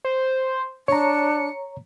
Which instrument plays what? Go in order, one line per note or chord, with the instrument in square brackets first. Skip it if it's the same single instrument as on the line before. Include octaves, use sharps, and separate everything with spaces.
[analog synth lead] C5
[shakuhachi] D4 [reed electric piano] C#5 A#5 [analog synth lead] C#7